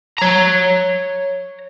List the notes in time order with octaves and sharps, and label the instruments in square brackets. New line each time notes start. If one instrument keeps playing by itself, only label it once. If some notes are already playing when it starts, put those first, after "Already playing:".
[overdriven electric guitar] C#5 A#5